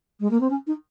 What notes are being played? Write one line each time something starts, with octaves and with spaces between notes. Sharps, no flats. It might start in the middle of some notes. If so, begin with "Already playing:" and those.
G#3
A#3
C4
C#4
D#4